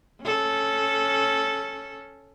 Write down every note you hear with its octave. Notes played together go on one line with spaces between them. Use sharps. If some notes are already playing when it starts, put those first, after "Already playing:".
C#4 A4